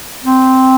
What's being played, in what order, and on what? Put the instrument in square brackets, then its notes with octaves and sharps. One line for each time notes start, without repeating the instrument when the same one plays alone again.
[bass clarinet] C4